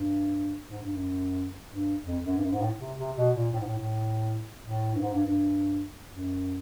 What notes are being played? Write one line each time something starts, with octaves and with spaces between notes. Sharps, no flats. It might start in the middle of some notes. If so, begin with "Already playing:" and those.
Already playing: G2
G#2
G2
F#2
G2
F2
F#2
G2
F#2
G#2
A2
C3
C3
B2
A#2
A2
G#2
A2
A2
A2
G2
G#2
G2
G2
F#2